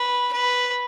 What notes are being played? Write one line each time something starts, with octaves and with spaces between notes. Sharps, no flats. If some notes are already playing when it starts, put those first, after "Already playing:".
Already playing: B4
B4